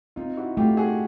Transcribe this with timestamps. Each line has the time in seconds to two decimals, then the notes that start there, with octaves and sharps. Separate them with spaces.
0.16 C4 D#4 F4
0.37 E4 F#4
0.57 A3 F4 G4
0.77 F#4 G#4